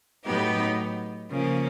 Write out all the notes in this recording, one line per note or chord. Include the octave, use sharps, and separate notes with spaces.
A2 F#3 B3 D#4 G4
C#3 F3 A#3 C#4